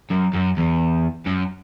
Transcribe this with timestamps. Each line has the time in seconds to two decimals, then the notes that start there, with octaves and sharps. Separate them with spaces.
0.10 F#2
0.34 F#2
0.57 E2
1.26 F#2